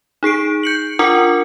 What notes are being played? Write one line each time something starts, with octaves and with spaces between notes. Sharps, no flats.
D#4 G#4 C7 D7
G6 C#7 F#7
D4 F4 A#4 F#5 D6 C#7